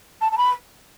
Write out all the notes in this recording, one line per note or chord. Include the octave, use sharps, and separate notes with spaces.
A5
A5
B5